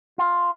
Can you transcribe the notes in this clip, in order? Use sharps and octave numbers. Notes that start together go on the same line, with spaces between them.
F4